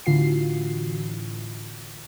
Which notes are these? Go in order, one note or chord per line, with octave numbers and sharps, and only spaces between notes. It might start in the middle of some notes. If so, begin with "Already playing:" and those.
A2 D3 E3 F4 F#4 C7